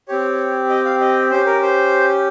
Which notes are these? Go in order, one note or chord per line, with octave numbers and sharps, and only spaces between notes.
C4 G4 C#5
D#5
F5
D#5
C#4 G4 C5
A#4
C5